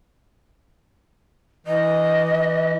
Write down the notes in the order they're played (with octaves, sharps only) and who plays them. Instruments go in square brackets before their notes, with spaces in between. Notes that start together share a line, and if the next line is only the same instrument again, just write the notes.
[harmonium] E3 [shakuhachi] D#5